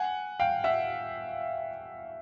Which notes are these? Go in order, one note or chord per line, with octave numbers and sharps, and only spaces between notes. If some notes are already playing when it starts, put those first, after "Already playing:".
Already playing: F#5 G#5
F5 G5
E5 F#5